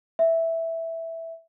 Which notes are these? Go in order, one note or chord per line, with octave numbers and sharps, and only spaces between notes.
E5